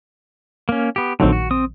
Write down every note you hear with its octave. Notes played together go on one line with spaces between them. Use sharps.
A#3 C#4
B3 G4
A#1 D3 D#3 F#3 A3 C4
F#4
C4 D#6